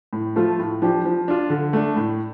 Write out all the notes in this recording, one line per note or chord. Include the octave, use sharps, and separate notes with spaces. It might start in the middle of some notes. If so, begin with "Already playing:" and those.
A2
F3 A3 F4
A2
F3 D4 G4
F3
D4 F4
D3
A3 D4
A2